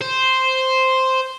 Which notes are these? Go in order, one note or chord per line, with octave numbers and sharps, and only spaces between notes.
C5